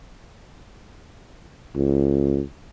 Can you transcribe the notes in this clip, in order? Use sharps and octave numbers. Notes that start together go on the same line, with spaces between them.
C#2